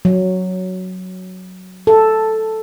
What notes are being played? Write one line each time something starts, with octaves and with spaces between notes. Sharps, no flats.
F#3
A4